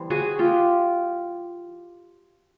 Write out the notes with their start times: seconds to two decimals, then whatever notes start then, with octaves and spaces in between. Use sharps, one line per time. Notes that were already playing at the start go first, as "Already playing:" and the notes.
Already playing: E3 G3 B3 C5
0.10 F#4 G#4
0.39 F4 G4